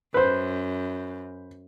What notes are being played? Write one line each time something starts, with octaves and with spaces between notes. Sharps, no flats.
F#2 B4 C5